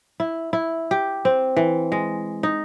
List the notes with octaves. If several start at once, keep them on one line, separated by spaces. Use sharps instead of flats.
E4
E4
G4
C4
E3
G#3
D#4